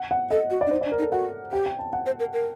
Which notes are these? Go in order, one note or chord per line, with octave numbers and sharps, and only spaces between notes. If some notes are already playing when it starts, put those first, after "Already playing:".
Already playing: F#5
F#5
A4 D#5
F#4
D5
D4
D#4 C5
D5
D4
A#4
D#4
A4
F#4 F#5
G4 G5
G5
A5
F#5
C5
A#4
A#4